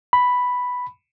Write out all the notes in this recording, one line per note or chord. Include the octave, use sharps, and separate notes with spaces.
B5